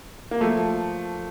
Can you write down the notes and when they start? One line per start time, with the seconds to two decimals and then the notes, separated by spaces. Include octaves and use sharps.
0.31 A#3
0.41 F3 A3